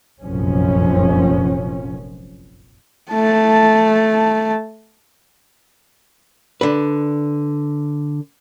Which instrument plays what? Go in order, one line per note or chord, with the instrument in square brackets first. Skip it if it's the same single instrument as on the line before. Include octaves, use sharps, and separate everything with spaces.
[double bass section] F1 A#1 F#2 F3 C#4
[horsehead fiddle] A3 A5
[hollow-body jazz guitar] D3 B4